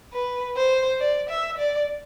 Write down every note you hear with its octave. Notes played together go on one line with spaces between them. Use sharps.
B4
C5
D5
E5
D5